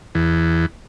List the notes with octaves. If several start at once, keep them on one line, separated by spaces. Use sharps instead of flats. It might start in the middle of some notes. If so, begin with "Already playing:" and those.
E2